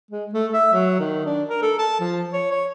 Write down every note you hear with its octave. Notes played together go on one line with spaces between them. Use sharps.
G#3
A3
E5
F#3
D#3
D4
A#4
A4
A5
F3
C#5
C#5